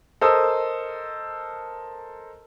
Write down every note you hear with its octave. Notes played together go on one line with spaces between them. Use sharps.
A4 A#4 C5 D#5 D#6 E6